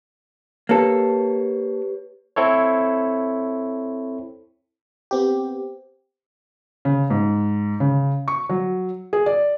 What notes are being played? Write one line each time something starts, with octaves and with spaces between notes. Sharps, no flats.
A#3 G4 A4 B4 C#5
C4 E4 A4 C#5
B3 C4 G4
C#3
G#2
C#3
C#6
F#3
G#4
D5